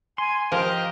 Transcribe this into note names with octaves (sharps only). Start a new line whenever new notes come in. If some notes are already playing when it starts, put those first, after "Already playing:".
G#5 C6
F3 G4 A#4 D#5 G5